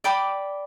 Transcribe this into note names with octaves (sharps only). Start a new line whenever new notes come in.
D5 G5 B5 D6